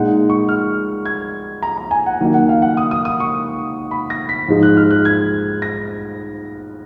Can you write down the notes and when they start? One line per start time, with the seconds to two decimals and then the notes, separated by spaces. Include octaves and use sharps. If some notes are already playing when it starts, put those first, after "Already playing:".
Already playing: A#2 G#3 D#4 F#5
0.30 C#6
0.49 F6
1.05 G#6
1.62 A#5
1.78 A#5
1.91 G#5
2.06 F#5
2.21 D#3 F#3 A#3 D#4
2.34 F#5
2.49 F5
2.62 F#5
2.77 D#6
2.91 D#6
3.05 D#6
3.20 C#6
3.91 B5
4.10 A#6
4.29 B6
4.48 G#2 F3 G#3 D#4
4.63 F#6
4.77 F6
4.91 F#6
5.05 G#6
5.62 A#6